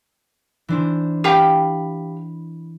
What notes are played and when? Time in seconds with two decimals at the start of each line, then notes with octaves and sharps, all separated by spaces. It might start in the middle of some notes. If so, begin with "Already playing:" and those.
0.68 E3 D4 C5
1.24 G4 F5 G5 B5